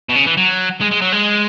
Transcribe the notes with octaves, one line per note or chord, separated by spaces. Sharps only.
B2
C#3
E3
F#3
G#3
G#3
F#3
G#3